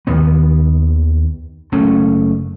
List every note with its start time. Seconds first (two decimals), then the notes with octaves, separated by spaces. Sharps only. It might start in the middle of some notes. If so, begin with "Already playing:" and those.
0.07 D#2 D#3 B3
1.72 F#1 A3 C#4